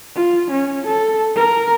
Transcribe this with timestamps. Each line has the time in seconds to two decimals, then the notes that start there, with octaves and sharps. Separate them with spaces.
0.15 F4
0.51 C#4
0.87 A4
1.36 A#4